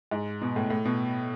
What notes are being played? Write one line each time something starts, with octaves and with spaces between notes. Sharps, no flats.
G#2
B2
A2
A2
B2